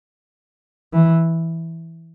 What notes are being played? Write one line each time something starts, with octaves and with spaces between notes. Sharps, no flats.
E3